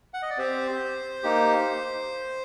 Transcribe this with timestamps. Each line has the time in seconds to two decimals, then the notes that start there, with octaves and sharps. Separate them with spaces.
0.14 F#5
0.22 D#5
0.30 D5
0.37 C4 G4 C5
1.23 A#3 D#4 G4